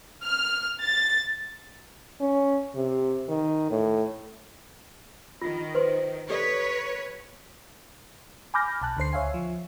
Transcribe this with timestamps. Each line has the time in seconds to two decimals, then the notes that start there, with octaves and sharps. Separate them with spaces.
0.24 F6
0.83 A6
2.20 C#4
2.75 C3
3.28 D#3
3.71 A2
5.42 D#3 F4
5.75 B4 C5 C6
6.29 G4 A4 B4 C#5 D5
8.54 G#5 B5 D6 F6 G6 A#6
8.81 B1 A5 F#6
8.97 D2 D3 C5 C7
9.13 C#2 C#5 E5 F5 G#5
9.34 F3